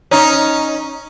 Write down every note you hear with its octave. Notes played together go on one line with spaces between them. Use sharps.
C#4 D#4